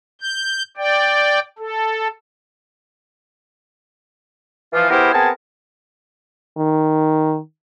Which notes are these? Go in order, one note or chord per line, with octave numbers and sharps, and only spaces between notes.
G6
D5 G5
A4
E3 F3 F4
B3 E4 G4 G#4 A#4 C5
B3 C4 G#4 A#4 G#5 A5
D#3